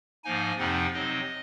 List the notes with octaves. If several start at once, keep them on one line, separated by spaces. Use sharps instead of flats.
G#2 F3 A#3 D#4 G#5
F2 C3 F3 C4 D#4 F#5
C3 F#3 C4 D#4 D#5